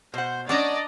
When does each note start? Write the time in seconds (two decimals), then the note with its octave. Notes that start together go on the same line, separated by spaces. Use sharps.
0.14 B2 C5 F#5
0.49 A3 C#4 D4 D5 D#5 F#5 A5 A#5